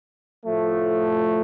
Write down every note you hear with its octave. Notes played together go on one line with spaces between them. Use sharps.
A2 F3 A3